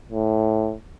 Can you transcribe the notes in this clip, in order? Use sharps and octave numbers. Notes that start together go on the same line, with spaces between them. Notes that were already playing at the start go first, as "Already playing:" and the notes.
A2